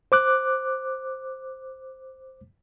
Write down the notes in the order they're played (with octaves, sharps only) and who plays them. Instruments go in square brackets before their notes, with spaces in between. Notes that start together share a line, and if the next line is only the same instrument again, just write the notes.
[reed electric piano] C5 D6 F#6